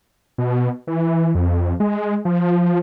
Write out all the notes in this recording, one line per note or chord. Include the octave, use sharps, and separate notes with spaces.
B2
E3
F2
G#3
F3